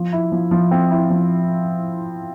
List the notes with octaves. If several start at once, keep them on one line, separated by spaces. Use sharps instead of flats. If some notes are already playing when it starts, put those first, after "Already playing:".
Already playing: F3
E4
F3
F3
C4
E4
F3